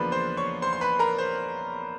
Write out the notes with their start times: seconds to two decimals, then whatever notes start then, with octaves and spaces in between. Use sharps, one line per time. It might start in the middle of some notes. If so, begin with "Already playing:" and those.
Already playing: E2 C#3 F3 A#3 D4 B4 B5
0.12 C5 C6
0.37 C#5 C#6
0.62 C5 C6
0.73 C6
0.81 B4 B5
0.99 A#4 A#5
1.18 C5